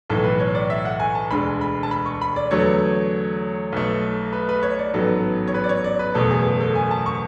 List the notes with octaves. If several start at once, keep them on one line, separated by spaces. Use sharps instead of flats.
B1 A2 E3 A4
B4
C#5
D5
E5
F#5
G#5
A5
E1 D2 D3 G#3 B5
B5
A5
B5
C#6
B5
D5
E2 D3 F#3 A3 C#5
B1 B2 A3
B4
B4
C#5
D5
A1 G#2 F#3 B3 A4
C#5
B4
D5
C#5
D5
B4
F#1 E2 B2 A3 A4
G#4
A4
G#5
A5
C#6